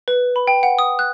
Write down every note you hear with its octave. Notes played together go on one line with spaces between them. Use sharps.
B4
B5
G5
F#5
D#6
F#6